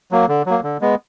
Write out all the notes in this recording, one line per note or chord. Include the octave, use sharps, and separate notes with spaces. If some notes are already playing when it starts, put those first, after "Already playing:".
F#3 A#3
D3
F#3 A#3
D3
G#3 B3